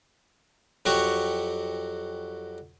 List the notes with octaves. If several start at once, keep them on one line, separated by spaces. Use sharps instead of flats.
F2 F#3 F#4 G4 C#6